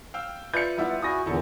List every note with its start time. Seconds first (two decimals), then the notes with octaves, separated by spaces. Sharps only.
0.14 F5 G5 E6
0.54 F4 B4 D5 E5 G6 C#7
0.78 G3 B3 E4 E5
1.02 E4 F#4 G#4 D#6 A#6
1.26 E2 A#2 D3 E4 A4 C#5